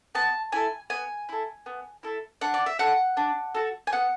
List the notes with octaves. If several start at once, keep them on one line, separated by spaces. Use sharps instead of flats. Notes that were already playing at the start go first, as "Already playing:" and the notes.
B3 A5
E4 A4 G#5
B3 G#5
E4 A4
B3
E4 A4
D4 F#5
D5
E5
F#4 A4 F#5
D4
F#4 A4
G#5
B3 F#5